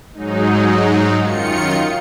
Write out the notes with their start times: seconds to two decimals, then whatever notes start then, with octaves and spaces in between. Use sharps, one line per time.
0.14 G#2 F#3 G#3 D#4
1.19 F#2 D#3 F4 C#7